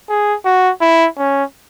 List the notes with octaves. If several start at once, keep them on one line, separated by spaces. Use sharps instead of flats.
G#4
F#4
E4
C#4